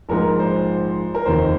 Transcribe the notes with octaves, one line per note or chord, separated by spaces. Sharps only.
A#1 G#2 F3 A#4
C5
A#4
F1 D#2 D#3 C5